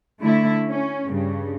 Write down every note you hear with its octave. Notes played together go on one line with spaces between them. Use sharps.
D3 A3 E4
C#4
G2 C#3